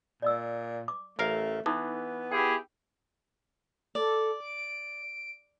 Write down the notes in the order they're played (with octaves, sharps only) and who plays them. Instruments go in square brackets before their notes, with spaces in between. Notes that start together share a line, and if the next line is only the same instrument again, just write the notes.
[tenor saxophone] A#2 [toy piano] D5 D#5 E6
[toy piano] D6
[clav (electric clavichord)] A1 A#4 F5 [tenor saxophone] A3
[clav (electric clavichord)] E3 [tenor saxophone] B3 [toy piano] D#4 A4
[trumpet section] E4 G4 G#4 [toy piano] G5
[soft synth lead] A4 [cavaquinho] D5
[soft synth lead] D7